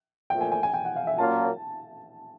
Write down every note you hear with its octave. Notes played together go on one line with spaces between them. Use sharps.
A#2 F3 A3 G5
G#5
G#5
G#5
G5
F#5
F5
E5
A#2 F#3 A#3 C#4 F4 A5